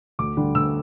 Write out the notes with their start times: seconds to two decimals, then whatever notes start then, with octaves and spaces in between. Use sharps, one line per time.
0.19 D2 D6
0.37 D3 G3 D4
0.55 D2 E6